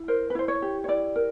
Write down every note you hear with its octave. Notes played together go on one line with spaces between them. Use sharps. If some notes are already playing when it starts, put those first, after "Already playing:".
Already playing: E4
A#4 C5
B4
E4 C5
C#5
G4
C#5
E4 D5
A#4